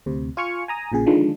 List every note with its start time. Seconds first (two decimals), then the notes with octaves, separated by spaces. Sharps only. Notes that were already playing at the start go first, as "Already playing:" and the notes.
0.06 D2 C3
0.37 F4 G#5 C#6 F6 C#7
0.68 G#5 A#5 D#6
0.92 A#1 A#2 C#3 G#4
1.06 D3 D#3 F3 G#3 D4